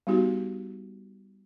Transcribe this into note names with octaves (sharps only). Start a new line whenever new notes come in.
G3 B3 D#4 F#4 G4